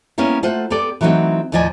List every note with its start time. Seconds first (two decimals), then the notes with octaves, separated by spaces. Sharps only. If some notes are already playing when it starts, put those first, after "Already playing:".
0.18 G3 A#3 B3 C#4 E4
0.43 A3 F4 C5 F#5
0.70 B3 G4 A4 D5
1.01 E3 F#3 A3 C4 D#4 F#4
1.52 D#2 A2 F3 D5 D#5 G#5